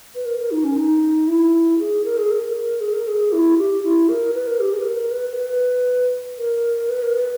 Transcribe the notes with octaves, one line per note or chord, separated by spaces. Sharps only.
B4
A#4
A#4
D#4
C#4
D#4
E4
G#4
A#4
G#4
A#4
G#4
A#4
G#4
E4
G4
E4
A#4
B4
A#4
G4
G#4
B4
A#4
B4
B4
A#4
B4
A#4
B4